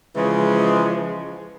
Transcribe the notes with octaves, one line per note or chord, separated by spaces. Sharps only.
C#3 E3 F3 G#3